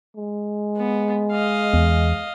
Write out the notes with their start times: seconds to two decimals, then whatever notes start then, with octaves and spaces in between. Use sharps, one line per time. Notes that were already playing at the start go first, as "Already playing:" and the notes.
0.16 G#3
0.76 B3
1.31 D#5 F5
1.74 E2